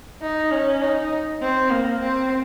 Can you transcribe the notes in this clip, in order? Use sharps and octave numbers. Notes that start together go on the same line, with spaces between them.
D#4
C#4
D#4
C4
A#3
C4